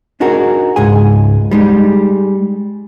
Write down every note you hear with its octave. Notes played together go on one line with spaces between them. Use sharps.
D4 D#4 F#4 G#4 A#4
C#2 G#2 G#4 G#5
G3 G#3 D#4